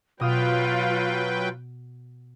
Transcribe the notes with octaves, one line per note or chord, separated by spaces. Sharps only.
B2 F#3 F4 B4 G5 D#6 F6